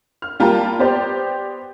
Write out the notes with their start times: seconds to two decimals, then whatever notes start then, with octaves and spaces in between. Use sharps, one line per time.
0.22 F6
0.40 G3 A#3 F4 G5 A5 A#5
0.79 B3 G4 C5 D5